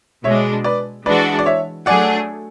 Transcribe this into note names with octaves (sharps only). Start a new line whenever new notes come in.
B2 G#3 D4 C#5 E5
B4 D5
E3 G#3 D4 F#4 B4 D5
D5
C#5 E5
F#3 A3 D4 G#4 D5 F#5